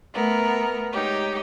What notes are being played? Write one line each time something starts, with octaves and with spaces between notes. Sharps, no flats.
A3 B3 A#4
G#3 D#4 G4 C#5